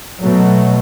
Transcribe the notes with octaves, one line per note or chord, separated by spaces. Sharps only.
B2 F#3 A3